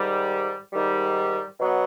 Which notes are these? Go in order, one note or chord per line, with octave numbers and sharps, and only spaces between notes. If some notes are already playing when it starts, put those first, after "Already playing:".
Already playing: G#2 D#3 G3
G#2 D#3 G3
B2 F#3 B3